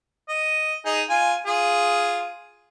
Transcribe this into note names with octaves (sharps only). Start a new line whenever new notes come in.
D#5
D#4 G#4
F4 G#5
F4 G#4